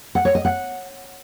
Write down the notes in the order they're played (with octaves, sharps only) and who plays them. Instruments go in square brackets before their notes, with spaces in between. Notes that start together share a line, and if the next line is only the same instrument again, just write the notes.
[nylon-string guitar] F#5
C#5
D#5
F#5